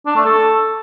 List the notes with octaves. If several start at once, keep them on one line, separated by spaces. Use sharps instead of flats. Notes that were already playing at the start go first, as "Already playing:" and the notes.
D4
A3
A4